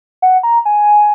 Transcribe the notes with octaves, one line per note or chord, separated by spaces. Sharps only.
F#5
A#5
G#5